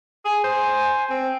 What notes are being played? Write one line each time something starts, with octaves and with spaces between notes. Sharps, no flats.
G#4 G#5
C5
C4